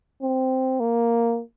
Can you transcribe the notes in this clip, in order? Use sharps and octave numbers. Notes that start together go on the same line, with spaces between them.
C4
A#3